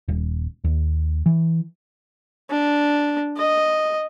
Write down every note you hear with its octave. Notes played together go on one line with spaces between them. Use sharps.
D#1
D#2
E3
D4
D#5